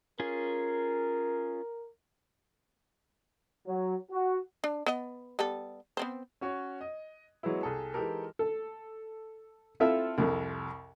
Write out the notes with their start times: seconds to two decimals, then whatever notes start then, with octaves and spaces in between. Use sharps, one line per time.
0.20 C#4 F4 G#4 A#4
3.67 F#3
4.10 F#4
4.64 D4
4.86 B3 D#5
5.39 G3 B3 A4
5.97 B3 C4 C5
6.41 C#4 F#4 C#5
6.81 D#5
7.43 F#3 G#3 B3 E4
7.63 C2 G#4 A4
7.94 E3 G#3 D#4 G4 A4 A#4
8.39 A4
9.80 C4 E4 F4 A4 E5
10.18 C2 F2 C3